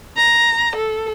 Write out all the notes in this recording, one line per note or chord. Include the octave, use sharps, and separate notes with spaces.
A#5
A4